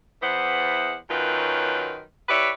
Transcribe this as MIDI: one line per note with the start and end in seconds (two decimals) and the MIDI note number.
0.22 0.95 40
0.22 0.95 52
0.22 0.95 59
0.22 0.95 72
0.22 0.95 78
1.09 2.02 42
1.09 2.02 51
1.09 2.02 54
1.09 2.02 65
1.09 2.02 71
2.29 2.49 64
2.29 2.49 67
2.29 2.49 71
2.29 2.49 73
2.29 2.49 74